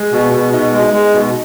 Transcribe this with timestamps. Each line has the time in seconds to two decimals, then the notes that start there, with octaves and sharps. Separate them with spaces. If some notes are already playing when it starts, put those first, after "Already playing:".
Already playing: G#3
0.12 B2
0.23 B3
0.33 B2
0.53 B2 D#4
0.73 G#3
0.83 D#4
0.94 G#3
1.14 B2 D#4